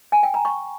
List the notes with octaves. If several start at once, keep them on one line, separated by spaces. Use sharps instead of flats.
G#5
G5
A#5
C#6